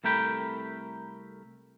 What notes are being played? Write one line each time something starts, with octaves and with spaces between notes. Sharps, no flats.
C2 A3 A#4 G5 B5